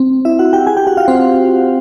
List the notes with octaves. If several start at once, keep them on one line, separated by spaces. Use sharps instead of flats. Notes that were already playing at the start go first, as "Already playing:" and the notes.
Already playing: C4
E4 E5
F#4 F#5
G4 G5
G#4 G#5
G4 G5
F#4 F#5
F4 F5
C4 C5